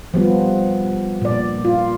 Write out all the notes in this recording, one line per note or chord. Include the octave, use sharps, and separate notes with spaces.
F3 G3 B3
A#2 D5
F4